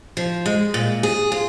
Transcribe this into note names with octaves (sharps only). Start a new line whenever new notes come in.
F3
G#3
A#2
G#4
F4